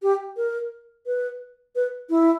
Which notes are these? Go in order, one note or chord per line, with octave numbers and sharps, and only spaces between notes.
G4
A#4
B4
B4
E4